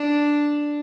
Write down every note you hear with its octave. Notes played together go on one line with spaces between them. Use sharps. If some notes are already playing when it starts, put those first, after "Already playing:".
Already playing: D4